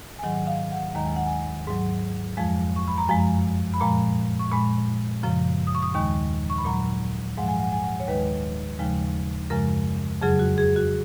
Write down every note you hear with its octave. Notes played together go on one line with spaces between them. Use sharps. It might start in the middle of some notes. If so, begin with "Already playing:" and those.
G#5
G#2 D#3 F#3 F#5
F5
F#5
D#2 D#3 G#3 A#5
G#5
F#5
G#5
G#2 F#3
F2 F3 G#3
C#6
B5
A#5
F#2 F3 G#3 G#5
B5
A#2 F3 G#3 A#5
C#6
A#2 G#3 B5
F#2 C#3 F3
D#6
C#6
D#6
D#2 D#3 G#3 C#6
C#6
B5
A#2 F#3 A#5
G#2 F3 G#3 F#5
G#5
F#5
G#5
F#5
C#5
D#2 D#3 G#3 B4
D#2 C#3 F3 G#3
F#2 C#3 F3 G#3 A#4
F2 C#3 F#3 G#4
F#4
G#4
F#4